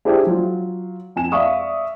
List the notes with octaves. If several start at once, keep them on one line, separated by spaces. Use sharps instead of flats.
D4 E4 G4 G#4 C5 D5
F#3 F4
F2 G#5 E7
D5 E5 F5 C#6 D#6